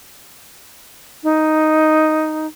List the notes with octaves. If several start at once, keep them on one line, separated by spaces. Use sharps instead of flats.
D#4